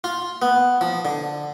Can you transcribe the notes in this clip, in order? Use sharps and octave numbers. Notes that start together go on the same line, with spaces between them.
F4
B3
F3
D3